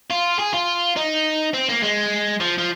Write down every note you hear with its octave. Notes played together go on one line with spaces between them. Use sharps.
F4
G#4
F4
D#4
C4
A#3
G#3
F3
F3